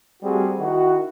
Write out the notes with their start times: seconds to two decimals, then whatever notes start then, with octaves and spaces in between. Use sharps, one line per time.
0.22 G3 A3 C4 F#4 G#4
0.59 D#3 E4 F#4